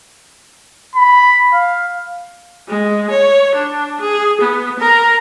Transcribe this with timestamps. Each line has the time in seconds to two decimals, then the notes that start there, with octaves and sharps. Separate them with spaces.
0.95 B5
1.53 F5
2.68 G#3
3.10 C#5
3.55 D4
4.01 G#4
4.41 B3
4.79 A#4 A#5